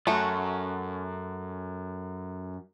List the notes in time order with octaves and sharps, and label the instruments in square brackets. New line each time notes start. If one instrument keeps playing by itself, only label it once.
[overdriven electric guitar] F#2 [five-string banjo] A3 F#4